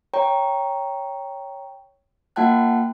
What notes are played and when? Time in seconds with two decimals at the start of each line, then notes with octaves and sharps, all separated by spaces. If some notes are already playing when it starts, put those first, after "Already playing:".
0.14 C#5 G5 A#5
2.36 A#3 F4 F#5 G5 A5 F#6